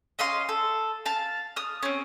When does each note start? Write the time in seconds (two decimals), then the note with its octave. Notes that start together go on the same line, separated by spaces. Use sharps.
0.19 C#4 D#5 F5 C6
0.49 A4
1.06 F5 A5
1.56 D#6 F6
1.83 C4 C#4